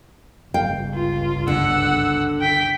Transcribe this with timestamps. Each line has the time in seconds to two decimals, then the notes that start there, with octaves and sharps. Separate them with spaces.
0.54 G1 C#2 F5 G5
0.94 F4
1.48 D3 F#5 E6
2.41 G5 B6